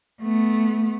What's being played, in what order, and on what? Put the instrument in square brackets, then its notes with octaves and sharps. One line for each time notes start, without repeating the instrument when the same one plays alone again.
[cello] A3 B3